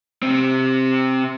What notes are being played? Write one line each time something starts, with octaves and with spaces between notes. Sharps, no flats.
C3 C4